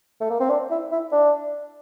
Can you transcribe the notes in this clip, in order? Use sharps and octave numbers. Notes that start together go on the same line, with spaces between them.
A3
A#3
C4
D4
E4
E4
D4